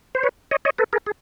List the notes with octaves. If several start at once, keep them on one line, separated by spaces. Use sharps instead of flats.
C5
B4 C#5
C#5 D#5
C#5 D#5
A4 B4
G#4 A#4
G#4